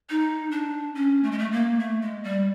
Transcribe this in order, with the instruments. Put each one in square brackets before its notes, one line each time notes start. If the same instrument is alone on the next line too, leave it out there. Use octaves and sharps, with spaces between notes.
[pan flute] D#4
D4
C#4
A3
G#3
A3
A#3
A3
G#3
G3